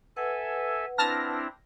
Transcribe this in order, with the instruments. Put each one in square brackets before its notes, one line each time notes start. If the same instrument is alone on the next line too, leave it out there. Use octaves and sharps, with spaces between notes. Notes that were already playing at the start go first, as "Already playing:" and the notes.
[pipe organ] A4 E5 G#5 [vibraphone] B4 F#5
[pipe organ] C4 D4 E4 [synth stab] A5 F6 A#6